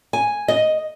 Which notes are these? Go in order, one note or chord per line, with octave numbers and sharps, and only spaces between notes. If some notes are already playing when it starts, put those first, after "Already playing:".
G#5
D#5